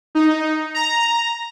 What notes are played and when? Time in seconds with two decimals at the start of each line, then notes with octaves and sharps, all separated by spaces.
0.15 D#4
0.74 A#5